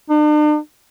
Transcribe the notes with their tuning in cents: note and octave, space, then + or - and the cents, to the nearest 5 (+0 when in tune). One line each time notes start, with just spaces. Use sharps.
D4 +45